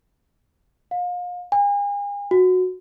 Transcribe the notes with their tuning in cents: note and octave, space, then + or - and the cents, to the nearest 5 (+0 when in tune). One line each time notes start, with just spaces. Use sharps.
F5 +35
G#5 -40
F#4 -10